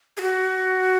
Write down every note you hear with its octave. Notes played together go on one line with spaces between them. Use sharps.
G#4
F#4